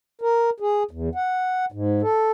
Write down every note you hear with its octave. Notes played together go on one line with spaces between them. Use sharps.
A#4
G#4
E2
F#5
G#2
A4